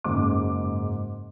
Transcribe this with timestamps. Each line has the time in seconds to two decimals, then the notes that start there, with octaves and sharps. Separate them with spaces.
0.04 F#1 G#2 D6